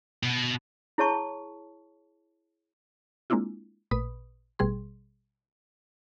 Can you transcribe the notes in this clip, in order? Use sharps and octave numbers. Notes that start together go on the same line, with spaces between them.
B2
E4 G#4 C#5 A5 C#6
G#3 A#3 C4 D4 E4 F4
A1 A#2 B4 B5 D#6
A1 B2 G3 G#4 C6